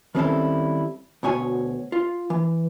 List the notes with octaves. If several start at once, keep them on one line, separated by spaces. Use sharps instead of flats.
D#3 G3 C4 C#4 E4 A4
D2 B2 C#5 G#5
F4
E3